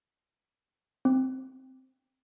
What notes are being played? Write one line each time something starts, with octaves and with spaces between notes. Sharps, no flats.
C4